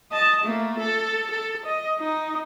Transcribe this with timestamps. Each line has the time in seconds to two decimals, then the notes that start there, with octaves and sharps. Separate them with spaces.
0.12 D#5 A5
0.44 A3 A#3
0.80 A4
1.31 A4
1.66 D#5
2.00 D#4